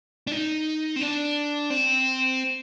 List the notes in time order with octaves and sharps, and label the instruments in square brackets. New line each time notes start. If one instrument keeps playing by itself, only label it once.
[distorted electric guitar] D4
D#4
C4
D4
C4